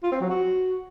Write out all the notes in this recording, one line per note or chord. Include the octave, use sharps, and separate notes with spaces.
F4
C4
F#3
F#4